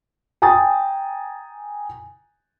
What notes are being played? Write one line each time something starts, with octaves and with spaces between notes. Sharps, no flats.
G5 G#5 A#5 D#6 A6